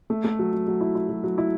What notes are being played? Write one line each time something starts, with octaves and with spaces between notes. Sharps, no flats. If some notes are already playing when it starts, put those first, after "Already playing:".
A3
A3
F#3
F#3
F#3
E4
E4
F#3
F#3
E4